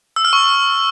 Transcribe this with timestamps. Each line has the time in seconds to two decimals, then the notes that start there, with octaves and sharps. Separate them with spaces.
0.16 E6
0.25 F6
0.33 C#6